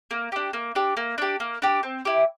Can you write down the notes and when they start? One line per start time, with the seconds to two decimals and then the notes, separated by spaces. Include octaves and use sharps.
0.11 A#3
0.32 D4 G4
0.53 A#3
0.75 D4 G4
0.97 A#3
1.18 D4 G4
1.40 A#3
1.62 D4 G4
1.83 C4
2.05 E4 G4